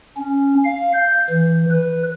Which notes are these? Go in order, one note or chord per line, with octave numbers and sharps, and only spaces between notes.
C#4
F5
G6
E3
B4